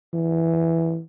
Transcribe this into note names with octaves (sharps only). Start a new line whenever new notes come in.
E3